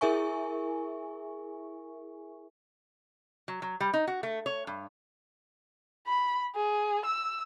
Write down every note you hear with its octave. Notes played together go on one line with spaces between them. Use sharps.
E4 G#4 A#4 E5 G#5 C#6
F#3
F#3
G3
D#4
F#4
A3
C#5
G2
B5
G#4
E6